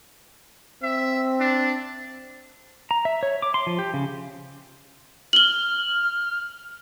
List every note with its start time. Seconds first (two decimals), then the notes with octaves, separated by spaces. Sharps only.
0.83 C4 E5
1.40 D4
2.91 A#5
3.05 E5
3.23 C#5
3.42 D6
3.54 C6
3.67 F3
3.79 G4
3.94 C#3
5.33 F6 F#7 G7